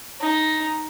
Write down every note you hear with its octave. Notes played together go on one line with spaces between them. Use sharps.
D#4